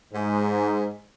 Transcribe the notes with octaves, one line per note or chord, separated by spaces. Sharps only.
G#2